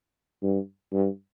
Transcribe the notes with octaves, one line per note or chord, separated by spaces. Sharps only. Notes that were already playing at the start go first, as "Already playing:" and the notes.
G2
G2